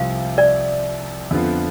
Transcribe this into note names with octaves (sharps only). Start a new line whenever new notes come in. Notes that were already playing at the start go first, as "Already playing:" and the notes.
Already playing: C2 C3 F3 C4 F5
D5
F2 D3 F3 B3 F4